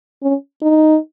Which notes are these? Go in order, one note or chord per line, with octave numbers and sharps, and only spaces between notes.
C#4
D#4